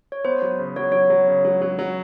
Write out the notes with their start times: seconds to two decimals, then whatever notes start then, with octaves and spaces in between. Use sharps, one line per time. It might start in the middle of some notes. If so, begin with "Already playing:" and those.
0.12 C#5
0.25 B3 C5
0.42 F#3
0.59 C#3
0.76 F#3 C#5
0.92 F#3 C#5
1.10 F#3
1.28 C#3
1.45 F#3
1.62 F#3
1.79 F#3